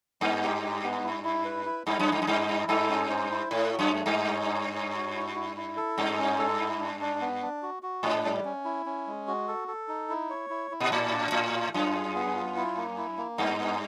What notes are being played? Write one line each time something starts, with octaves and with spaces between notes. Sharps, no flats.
G2 B3
G4
G4
B3
E4
E4
B4
E4
G2 E4
F#2
E4
G2
F#2
G2 E4
E4
G2 A4
C#4
C5
E4
A2 A3
F#4
F#2
A3
G2
A3
C#5
C#5
C#5
F#4
E4
E4
E4
A4
G2 C#4
C#4
A4
E4
D4
D4
B3
D4
F#4
F#4
G#2 D4
G3
C#4
E4
C#4
G#3
F#4
A4
A4
D#4
E4
C#5
E4
E4
A#2
A2 D5
D4
A2 F4
F4
F#2 F4
G#4
B3
F4
E4
A#3
E4
A#3
G2 B3
B3